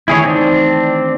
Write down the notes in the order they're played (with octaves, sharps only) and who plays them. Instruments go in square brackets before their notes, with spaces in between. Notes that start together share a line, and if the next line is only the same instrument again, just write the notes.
[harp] D#3 E3 A3 [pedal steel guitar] E4 G#4 C#5
[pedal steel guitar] C4 D4